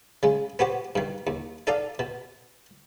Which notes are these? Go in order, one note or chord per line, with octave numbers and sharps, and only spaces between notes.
C#3 G#3
B3 F#4 G4 C5
G2 D#3
D#2
D#4 A4 D5 F5
B2